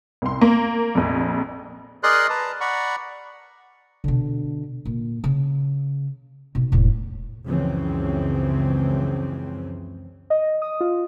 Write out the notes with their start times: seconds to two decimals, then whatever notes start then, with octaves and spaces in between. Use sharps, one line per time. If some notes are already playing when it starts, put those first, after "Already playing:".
0.22 C2 C6
0.41 A#3
0.95 A#1 F2
2.03 G#4 A#4 D5 D#5 C6 F#6
2.30 B4 A5 A#5
2.61 D5 F#5 A#5 B5 C#6
4.04 B2 D3
4.85 A#2
5.24 C#3
6.55 B2 D#4
6.72 E1 A2
7.45 C#2 F#2 C#3 E3 F3 C4
10.30 D#5
10.62 D#6
10.80 F4